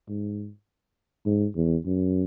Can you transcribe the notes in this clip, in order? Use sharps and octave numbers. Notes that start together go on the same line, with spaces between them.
G#2
G#2
E2
F#2